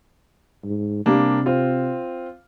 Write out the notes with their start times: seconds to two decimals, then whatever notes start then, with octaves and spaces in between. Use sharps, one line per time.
0.64 G#2
1.06 C3 G3 A#3 D4
1.46 C4 F4